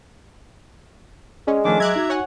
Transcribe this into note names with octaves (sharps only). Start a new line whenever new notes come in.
G#3 C#4 D5
D#3 F3 A3 C#4 D4 D6
F#3 E5 A#5 D6 F#6 G#6
D#4 F#4
C#5 F#5 G#5